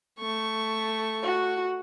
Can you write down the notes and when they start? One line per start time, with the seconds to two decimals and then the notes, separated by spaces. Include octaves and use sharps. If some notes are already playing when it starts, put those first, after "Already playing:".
0.19 A3 C#6
1.23 F#4